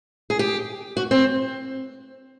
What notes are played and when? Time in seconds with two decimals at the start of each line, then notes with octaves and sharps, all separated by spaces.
0.30 G#4
0.39 G4
0.97 F#4
1.11 C4